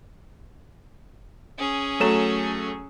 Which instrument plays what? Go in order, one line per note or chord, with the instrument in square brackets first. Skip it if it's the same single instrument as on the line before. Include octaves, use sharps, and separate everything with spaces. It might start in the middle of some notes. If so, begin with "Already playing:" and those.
[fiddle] C#4 G#4
[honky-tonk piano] F#3 A3 E7